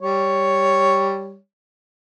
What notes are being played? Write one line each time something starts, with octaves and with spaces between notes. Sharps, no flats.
G3 C#5